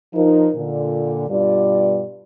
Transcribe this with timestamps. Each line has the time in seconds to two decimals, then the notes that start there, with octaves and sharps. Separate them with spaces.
0.14 F3 D#4 A#4
0.56 A#2 D3
1.30 G2 B2 G3 F4 D5